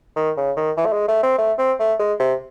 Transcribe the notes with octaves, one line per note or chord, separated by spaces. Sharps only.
D#3
C#3
D#3
E3
A3
G#3
A3
C4
A3
C4
A3
G#3
C3